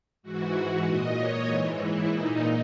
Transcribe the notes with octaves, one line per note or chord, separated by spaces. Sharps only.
G#2 E3 F#4
A#2 D#5
C#5
G#2 E3
E4
A#2 D#4